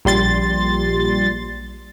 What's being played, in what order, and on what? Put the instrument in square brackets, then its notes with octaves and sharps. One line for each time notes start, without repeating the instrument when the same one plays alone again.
[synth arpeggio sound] A#1 G3 C6 A6